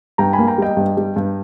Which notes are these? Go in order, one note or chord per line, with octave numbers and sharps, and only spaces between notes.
G2 G5 A#5
G#5 B5
A#3
G5 A#5
G3 D#5 G5
G2
G3
G2